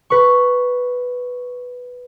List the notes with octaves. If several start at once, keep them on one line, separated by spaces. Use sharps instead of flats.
B4 C#6